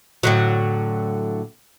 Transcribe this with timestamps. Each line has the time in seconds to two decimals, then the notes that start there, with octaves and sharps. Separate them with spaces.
0.23 A2 D3 F#3